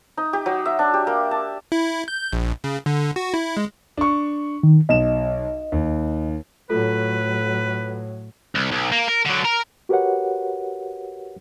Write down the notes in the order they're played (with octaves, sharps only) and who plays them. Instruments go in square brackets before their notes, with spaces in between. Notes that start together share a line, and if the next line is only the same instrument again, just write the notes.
[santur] D#4
G4
F#3
E5
D4
G4
A#3
A5
[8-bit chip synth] E4
G6
A#1
C#3
D3
F#4
E4
G#3
[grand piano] D4 C#6
[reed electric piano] D#3
[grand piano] B1 E7 [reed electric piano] D#5
[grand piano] D#2
[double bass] A2 F#3 [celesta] F4 A4 [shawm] B4
[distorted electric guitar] C2
B1
A#3
A#4
D3 F#3
A#4
[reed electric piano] F#4 G4 A#4 B4 C#5 F#5